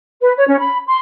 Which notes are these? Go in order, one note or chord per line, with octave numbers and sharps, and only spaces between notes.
B4
C#5
C#4
B5
C6